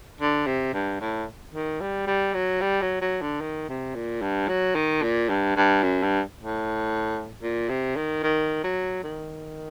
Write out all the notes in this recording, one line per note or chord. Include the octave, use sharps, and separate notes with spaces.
D3
C3
G2
A2
D#3
G3
G3
F#3
G3
F#3
F#3
D3
D#3
C3
A#2
G2
F#3
D#3
A#2
G2
G2
F#2
G2
A2
A#2
C3
D#3
D#3
F#3
D#3